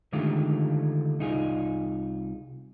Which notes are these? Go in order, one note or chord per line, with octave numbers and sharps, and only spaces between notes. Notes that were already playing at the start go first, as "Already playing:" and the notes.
D3 D#3 G#3 A3 F4 G4
C2 D#4 F4 G#4